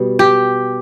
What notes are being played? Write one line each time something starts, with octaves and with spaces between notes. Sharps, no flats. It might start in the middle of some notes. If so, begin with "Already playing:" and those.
Already playing: B2 G3
G4